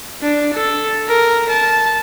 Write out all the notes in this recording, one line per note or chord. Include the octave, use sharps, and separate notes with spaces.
D4
A4
A#4
A5